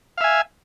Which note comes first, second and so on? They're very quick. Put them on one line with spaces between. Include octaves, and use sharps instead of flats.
F5 E5 G#5